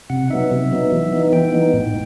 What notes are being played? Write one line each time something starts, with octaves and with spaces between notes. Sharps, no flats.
C3 F#5
F#3 B3 D#4 E5
C3
F#3 B3 D#4
E3
B3 D#4
E3 G5
B3 D#4
A2